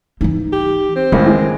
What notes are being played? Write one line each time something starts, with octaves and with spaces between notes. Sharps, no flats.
E3 D#4
G4
C4
C#2 A2 D#3 A#3
E3 G#3